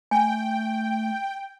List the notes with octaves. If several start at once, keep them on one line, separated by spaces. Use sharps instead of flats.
A3 G5 G#5